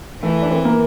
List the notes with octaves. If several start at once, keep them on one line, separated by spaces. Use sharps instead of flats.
E3 A3
D4
C4
A#3